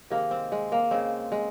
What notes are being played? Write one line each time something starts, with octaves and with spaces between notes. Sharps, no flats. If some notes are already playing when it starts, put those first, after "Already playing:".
C3 D#3 G#3 A#3
C4
G#3
A#3
C#3 G#3 C4
G#3